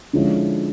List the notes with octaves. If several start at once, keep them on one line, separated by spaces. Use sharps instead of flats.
D3 F3 G#3 C#4 E4